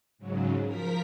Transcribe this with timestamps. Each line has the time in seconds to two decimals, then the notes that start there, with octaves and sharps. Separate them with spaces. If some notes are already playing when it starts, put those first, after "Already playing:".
0.18 G#2 C#3 F#3
0.65 F3 A#4 A#5 B6